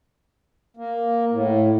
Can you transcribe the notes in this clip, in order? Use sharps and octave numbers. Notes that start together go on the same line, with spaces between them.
A#3
A2